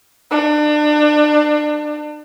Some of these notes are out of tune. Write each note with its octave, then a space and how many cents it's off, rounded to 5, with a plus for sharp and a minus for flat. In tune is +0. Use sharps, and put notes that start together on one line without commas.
D4 +30